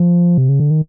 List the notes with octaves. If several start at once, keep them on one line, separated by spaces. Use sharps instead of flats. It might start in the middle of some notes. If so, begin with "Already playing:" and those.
Already playing: F3
C3
C#3
D3
D#3